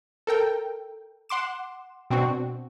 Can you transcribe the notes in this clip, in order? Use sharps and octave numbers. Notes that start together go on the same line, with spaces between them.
A4 A#4 G5
F#5 C6 D6 E7
B2 C4 D4 F#4